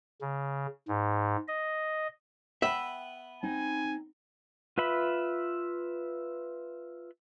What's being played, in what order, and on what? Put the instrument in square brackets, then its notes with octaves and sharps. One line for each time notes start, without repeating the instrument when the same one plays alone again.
[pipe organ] C#3
G#2
D#5
[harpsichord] B3 B4 [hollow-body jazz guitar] E5 [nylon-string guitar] G5
[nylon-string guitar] C4 D#4 [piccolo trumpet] G#5
[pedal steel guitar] F4 B4 E5 B5